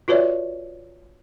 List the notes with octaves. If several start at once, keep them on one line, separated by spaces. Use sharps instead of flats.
F4 F#4 B4 C#5 D5 E5